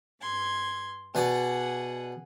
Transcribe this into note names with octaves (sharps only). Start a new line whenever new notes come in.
G2 C6 G#6
B2 G#4 D5 F#5